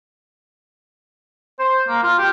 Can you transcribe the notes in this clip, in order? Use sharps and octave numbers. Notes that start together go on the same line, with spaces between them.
C5
A#3
F4
G4